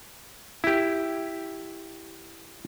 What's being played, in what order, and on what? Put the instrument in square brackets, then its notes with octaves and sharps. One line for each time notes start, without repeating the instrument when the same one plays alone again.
[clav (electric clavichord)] E4 G4